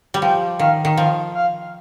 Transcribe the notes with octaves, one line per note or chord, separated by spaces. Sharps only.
G3
F3 G5
D#3 F5
D#3
F3 F5
F5